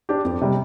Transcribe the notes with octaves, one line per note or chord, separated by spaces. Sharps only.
D4 G4
F2
C3 G3